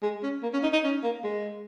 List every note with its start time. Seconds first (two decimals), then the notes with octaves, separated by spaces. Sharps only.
0.03 G#3
0.23 C#4
0.43 A#3
0.53 C#4
0.63 D#4
0.73 D#4
0.84 C#4
1.04 A#3
1.24 G#3